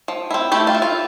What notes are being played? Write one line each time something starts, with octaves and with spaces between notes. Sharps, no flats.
F3
C4 E4
A3 E4 G4
F4
E4
F4